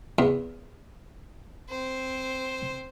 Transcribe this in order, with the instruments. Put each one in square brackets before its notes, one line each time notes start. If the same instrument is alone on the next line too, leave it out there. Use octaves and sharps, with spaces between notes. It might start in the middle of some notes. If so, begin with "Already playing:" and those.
[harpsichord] E2
[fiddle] C4 C5